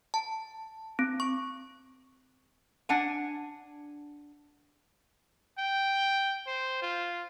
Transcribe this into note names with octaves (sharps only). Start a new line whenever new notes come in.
A5
C4
C#6
D4 F#5 G#5
G5
C5
F4